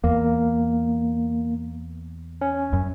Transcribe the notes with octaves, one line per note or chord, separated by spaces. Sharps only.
E2 A#3
C#4
F#2